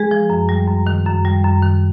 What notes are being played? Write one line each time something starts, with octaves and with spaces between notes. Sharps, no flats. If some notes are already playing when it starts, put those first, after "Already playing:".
Already playing: G#3 G#4
F3
F#2
G3
F#2
D#3
F#2
G3
F#2
D#3